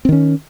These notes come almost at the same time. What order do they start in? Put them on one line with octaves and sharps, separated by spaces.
C4 D#3 C#4